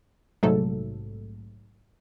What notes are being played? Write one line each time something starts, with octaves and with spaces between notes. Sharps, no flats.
A#1 G#2 C3 F#3 A3 A4